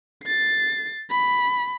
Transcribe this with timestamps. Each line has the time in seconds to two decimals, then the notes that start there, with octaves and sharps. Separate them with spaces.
0.24 A6 C7
1.10 B5